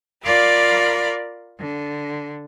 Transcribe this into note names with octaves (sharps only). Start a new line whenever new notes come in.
F4 A#4 D5 F5 B5 D6
D3